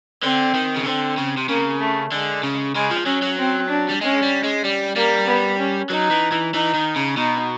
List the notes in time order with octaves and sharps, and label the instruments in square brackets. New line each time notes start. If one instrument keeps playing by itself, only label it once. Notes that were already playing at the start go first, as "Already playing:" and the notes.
[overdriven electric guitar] D3 [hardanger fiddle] C4
[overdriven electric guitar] D#3
C#3
[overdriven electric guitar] D3 [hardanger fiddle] C4
[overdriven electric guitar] C#3
C3
[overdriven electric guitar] C#3 [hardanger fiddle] A#3
[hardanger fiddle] A3
[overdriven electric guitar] D3 [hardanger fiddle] G#3
[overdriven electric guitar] C#3
[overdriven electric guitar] C#3 [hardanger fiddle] G#3
[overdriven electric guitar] F3
[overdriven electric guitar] F#3 [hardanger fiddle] C#4
[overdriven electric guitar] F#3
[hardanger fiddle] C4
D4
[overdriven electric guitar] G3
[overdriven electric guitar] G#3 [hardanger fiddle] C#4
[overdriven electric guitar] G3
G#3
G3
[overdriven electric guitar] G3 [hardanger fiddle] A#3
[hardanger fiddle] B3
C#4
[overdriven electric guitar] F#3 [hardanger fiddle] D#4
[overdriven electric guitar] E3
E3
[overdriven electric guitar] E3 [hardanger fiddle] D#4
[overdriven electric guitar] D#3
C#3
[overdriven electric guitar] B2 [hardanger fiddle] D#4